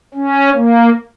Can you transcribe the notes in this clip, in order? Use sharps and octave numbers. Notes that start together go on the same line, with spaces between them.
C#4
A#3